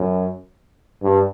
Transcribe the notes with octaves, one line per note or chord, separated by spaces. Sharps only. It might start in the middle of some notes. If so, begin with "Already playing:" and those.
Already playing: F#2
G2